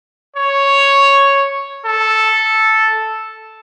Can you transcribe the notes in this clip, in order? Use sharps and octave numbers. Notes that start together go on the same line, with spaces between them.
C#5
A4